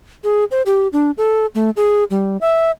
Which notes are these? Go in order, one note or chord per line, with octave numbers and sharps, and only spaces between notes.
G#4
C5
G4
D4
A4
A3
G#4
G3
E5